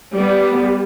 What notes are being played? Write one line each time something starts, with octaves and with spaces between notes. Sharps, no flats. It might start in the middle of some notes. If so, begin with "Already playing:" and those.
G3 B3